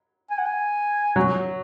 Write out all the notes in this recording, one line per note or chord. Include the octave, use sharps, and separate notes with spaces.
G#5
F#5
G#5
F#3